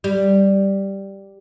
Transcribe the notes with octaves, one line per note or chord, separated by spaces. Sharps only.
G3